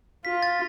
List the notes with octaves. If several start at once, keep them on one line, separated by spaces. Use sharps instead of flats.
F4 B6
A6